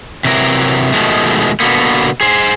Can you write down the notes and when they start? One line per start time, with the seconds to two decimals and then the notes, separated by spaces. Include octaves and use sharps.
0.25 C3 E3 F#3 A#4
0.92 B2 D#3 F3 G#3 A3
1.60 B2 D3 A#3 B3
2.21 G#4 C5